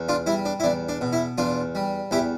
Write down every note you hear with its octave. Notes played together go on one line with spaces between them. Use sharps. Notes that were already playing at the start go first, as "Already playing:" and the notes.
Already playing: E2
D4 F4
G3 E4
D4
E4
E2 D4
D4
B2
E4
E2 D4 F4
G3
E2 E4 G4